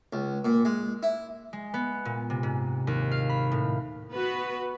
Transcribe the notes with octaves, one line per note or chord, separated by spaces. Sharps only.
C#2
A#2
G#3
E4
G#3
B3
A#2
C3
G#2
D#2
F5
B5
A2
B3 F#4 B4